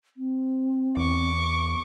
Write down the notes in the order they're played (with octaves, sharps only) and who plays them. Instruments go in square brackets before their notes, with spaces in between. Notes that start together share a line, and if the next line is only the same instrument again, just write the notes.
[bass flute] C4
[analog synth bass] E2 [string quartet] C#6 D6